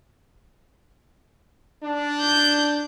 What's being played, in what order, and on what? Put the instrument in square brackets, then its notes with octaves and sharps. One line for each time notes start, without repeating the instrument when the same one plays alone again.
[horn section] D4
[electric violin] G6